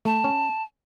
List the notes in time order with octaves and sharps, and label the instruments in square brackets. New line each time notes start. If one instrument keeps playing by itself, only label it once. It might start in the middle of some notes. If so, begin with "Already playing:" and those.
[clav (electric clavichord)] A3 [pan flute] A5
[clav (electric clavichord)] C#4